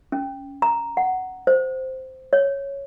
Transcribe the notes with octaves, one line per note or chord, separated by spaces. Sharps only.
C#4
A#5
F#5
C5
C#5